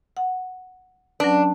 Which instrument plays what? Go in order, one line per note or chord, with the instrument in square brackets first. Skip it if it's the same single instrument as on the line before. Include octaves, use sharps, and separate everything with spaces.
[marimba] F#5
[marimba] F#3 C#4 B4 [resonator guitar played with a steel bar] D4